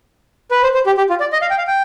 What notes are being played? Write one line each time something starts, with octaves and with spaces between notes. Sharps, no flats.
B4
C5
C5
G4
G4
F4
D5
D#5
F5
G5
F5
G5